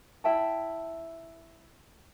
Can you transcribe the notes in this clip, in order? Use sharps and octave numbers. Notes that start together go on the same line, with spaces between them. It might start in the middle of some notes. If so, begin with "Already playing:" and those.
E4 E5 G5 A5